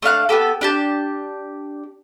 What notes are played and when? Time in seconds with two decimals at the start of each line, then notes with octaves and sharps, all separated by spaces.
0.02 A3 D4 F5 F#6
0.29 B3 C#4 G4 A4
0.61 D4 G4 A5